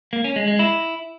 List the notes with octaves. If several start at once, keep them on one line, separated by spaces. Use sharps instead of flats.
A#3
C#4
G#3
G#3
E4